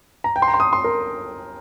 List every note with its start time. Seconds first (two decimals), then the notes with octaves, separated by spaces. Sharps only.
0.24 A#5
0.36 G5
0.42 C6
0.48 A#5
0.54 C6
0.60 D#6
0.73 C6
0.84 A#4